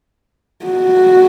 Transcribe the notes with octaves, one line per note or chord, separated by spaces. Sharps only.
F#4